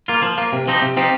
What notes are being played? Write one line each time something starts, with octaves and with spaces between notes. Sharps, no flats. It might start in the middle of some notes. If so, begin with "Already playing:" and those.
A#3 F4
F3
A#3 F4
C3
F3 C4 D#4 G4
C3
F3 C4 D#4 G4